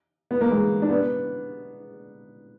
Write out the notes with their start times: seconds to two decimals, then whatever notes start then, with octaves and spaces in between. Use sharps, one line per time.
0.31 B3
0.41 A#3
0.51 G#3
0.82 D4
0.90 B3